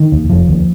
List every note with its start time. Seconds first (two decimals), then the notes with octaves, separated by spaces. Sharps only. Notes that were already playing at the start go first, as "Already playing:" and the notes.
Already playing: D#3
0.12 D#2
0.30 F1 F3
0.48 D#2